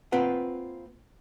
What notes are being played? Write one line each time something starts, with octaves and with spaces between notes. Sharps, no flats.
A#3 C4 F4 B4 F#5